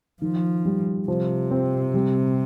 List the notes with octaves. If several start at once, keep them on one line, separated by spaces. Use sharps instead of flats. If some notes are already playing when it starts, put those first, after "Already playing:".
D#3 F3
G3
C3 F3
C4
G3